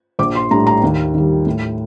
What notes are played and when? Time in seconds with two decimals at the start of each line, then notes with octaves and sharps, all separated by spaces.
0.19 A#1 D6
0.35 C6
0.51 A2 G3 D4 A#5
0.67 A#5
0.83 D#2
1.14 D#3 G3
1.47 A2